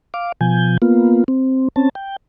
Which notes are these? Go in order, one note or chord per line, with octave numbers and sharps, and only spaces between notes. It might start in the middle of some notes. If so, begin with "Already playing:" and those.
F5 D6
B2 F3 G#5 G6
A#3 B3 F4
C4
C4 C#4 A5
G5